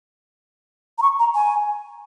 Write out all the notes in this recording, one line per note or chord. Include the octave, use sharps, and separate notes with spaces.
A#5
C#6
A#5
G#5